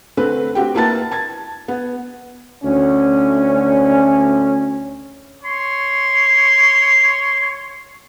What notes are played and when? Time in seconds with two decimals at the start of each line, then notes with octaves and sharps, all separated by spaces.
0.17 D3 A3 C4 B4
0.55 C4 F#4 G4 G5
0.75 A#3 E4 B4 A5 A6
1.11 A5 G#6 A6
1.68 B3
2.64 D2 C#4
5.43 C#5 C6